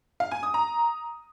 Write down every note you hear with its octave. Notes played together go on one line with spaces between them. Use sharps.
F5
G#5
D#6
A#5